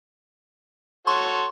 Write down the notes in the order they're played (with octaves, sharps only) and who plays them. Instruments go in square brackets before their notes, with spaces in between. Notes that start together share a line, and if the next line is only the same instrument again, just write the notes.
[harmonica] F#4 A4 C#5 [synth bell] C6 C#6